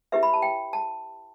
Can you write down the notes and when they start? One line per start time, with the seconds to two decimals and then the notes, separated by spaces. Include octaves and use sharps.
0.12 E4 G4 B4 E5
0.23 B5
0.34 A5
0.42 G5
0.73 A5